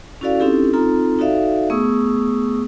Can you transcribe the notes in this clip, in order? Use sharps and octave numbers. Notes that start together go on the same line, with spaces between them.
C#4 E4 F#4 A4 D5 F5
C4 C#4 D#4 E4 G4 A4
C4 D#4 F4 A4 A#5
D#4 F#4 A4 D5 E5 F5
A3 B3 G#4 C#6 D#6 E6